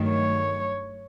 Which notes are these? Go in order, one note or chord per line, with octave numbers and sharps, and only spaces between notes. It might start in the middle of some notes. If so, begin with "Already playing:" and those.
Already playing: G2 D#3 F#3 A3
C#5